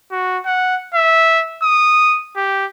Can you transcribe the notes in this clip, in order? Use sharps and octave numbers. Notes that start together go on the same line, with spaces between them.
F#4
F#5
E5
D#6
G4